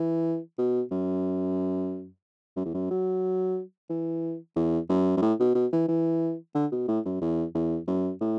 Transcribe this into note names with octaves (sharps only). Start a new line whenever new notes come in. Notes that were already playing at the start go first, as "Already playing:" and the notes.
Already playing: E3
B2
F#2
F#2
E2
F#2
F#3
E3
E2
F#2
F#2
A2
B2
B2
E3
E3
D3
B2
A2
F#2
E2
E2
F#2
A2